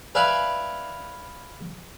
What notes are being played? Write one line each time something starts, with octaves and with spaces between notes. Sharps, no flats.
B4 D5 E5 F5 G#5 B5